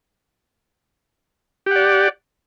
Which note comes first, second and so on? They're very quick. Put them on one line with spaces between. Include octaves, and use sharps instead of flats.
G4 F#5 D5